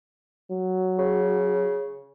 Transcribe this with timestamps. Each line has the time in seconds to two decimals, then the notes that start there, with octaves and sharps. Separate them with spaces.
0.51 F#3
0.98 C#3